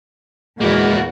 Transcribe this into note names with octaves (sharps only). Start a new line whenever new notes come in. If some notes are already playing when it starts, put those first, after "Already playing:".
E2 A#2 G#3 A#3 E4 F#4